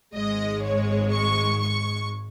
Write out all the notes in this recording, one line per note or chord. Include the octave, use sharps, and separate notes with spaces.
G#1 G#2 G#3 D#5
C#5
C#6
C#6